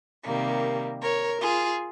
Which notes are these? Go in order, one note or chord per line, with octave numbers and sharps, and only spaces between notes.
C3 D#3 G3 A#3
A#4 C#5
F4 G#4